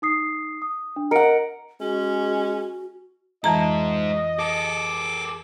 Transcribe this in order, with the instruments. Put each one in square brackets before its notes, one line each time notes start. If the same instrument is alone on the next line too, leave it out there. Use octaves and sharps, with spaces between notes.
[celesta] D#4 D#6 C7
D#6
D4
[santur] A#4 F#5 [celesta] D#5 C#7 D7
[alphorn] G#3 [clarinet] C#4 [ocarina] F#4
[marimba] F2 E3 A#5 [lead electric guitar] G#3 D#4 [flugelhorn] D#5
[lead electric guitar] G#4 A4 [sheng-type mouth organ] D6